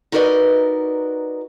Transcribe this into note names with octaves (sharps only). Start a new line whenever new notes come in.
D#4 F#4 A#4 B4 D5 D#5